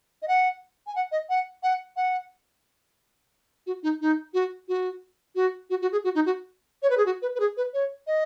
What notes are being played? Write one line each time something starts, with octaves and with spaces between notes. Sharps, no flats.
D#5
F#5
G#5
F#5
D#5
F#5
F#5
F#5
F#4
D#4
D#4
F#4
F#4
F#4
F#4
F#4
G#4
F#4
D#4
F#4
C#5
B4
G#4
F#4
B4
B4
G#4
B4
C#5
D#5